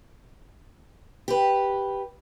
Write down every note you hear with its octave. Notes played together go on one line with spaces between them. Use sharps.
G4 B4